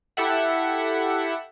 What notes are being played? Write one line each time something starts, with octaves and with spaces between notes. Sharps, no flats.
E4 G4 A4 E5 F#5